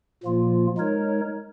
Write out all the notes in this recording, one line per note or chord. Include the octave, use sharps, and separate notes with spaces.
A#2 F3 A#3 F4
G#3 D#4 A#4 C#5